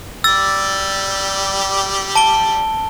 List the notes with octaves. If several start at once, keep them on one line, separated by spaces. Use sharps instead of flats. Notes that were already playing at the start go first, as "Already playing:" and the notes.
G3 G4 D5 E6 A6
A5 D7 G7